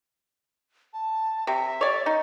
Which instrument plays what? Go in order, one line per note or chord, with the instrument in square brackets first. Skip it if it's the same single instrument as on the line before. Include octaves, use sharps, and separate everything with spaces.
[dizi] A5
[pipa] C3 [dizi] E5
[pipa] C#5 D5
D#4